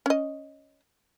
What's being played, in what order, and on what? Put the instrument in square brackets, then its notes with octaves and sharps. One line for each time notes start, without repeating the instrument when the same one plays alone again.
[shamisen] C#4 D#5